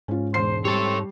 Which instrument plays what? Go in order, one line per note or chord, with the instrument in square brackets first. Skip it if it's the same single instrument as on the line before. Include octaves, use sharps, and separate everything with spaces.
[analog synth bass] G#2 [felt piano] C#4 F4
[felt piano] E1 C6 C7 [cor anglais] C5
[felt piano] G3 [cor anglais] C4 [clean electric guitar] A4 C#5